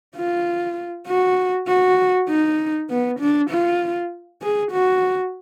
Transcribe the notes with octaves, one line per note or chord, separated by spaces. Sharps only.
F4
F#4
F#4
D#4
B3
D4
F4
G#4
F#4